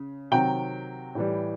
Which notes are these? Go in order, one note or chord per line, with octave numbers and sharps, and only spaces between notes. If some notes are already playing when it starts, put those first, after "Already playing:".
Already playing: C#3
C3 D#3 F#3 G5
A2 E3 G3